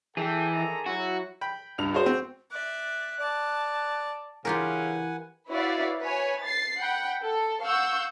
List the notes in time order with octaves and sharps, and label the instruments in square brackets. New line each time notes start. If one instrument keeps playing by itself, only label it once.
[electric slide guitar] E3 [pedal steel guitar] G#4 D5 E5 [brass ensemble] A4 G5
[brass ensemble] D#3 A4 A#5
[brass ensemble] F#3 E4 [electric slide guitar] F#4
[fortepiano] G5 B5
[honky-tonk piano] C#2 G2 F7
[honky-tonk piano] F#4 [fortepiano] G#4 C5
[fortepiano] C4
[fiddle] D5 E5 [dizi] F#6
[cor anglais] D5 [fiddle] A5
[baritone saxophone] C#3 [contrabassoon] E3 [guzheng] F4 G4 A#4 [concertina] B4 F#5 G#5
[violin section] E4 F#4 B4 C#5 D5 F5
B4 C#5 G#5
A6 C7
F#5 G5 B5
A4
F5 F#5 C#6 E6 G6